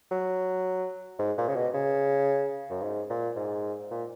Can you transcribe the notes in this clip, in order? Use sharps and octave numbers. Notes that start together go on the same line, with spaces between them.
F#3
G#2
A#2
C#3
B2
C#3
F#2
G#2
A#2
G#2
A#2